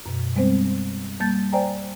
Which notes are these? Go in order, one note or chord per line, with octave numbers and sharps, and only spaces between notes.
F#2 B2
G3 G#3 B3 C4 C5
G3 A#3 A5 G6 A6
C5 D5 G5 G#5 A#5